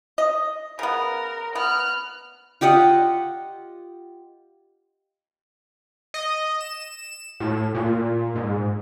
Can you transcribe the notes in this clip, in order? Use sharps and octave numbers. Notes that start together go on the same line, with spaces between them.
D#5
C#3 B3 A#4
B3 F6 F#6
F4 G4 D#5 F#5
D#5
E7
A2
A#2
G#2